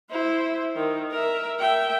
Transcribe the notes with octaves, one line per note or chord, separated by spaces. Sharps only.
E4 C5
D#3
A#4 E5
E5 G5